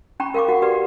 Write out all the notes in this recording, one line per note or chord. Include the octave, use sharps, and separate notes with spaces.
C#4 G5 A#5 B5 C#6
A#4 F5 G5 C#6 D6
F#4 F#5
G4 B4 D5 F#5